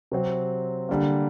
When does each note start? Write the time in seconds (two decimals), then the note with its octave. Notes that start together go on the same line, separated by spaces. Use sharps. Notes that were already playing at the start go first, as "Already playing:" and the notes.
0.12 C3 F#3 C4
0.89 D3 G3 A#3